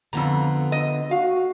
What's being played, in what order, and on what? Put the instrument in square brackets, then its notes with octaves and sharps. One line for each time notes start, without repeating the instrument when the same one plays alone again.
[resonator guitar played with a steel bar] F2 A#5 [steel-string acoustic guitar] D3 B3 F4
[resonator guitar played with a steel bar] D#5
[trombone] F#4 [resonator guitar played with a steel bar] F5